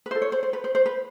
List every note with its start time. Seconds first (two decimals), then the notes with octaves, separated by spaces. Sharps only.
0.06 B4
0.11 F4 A4 C5
0.22 C#5
0.32 C5
0.43 C5
0.53 B4
0.64 C5
0.75 C5
0.86 B4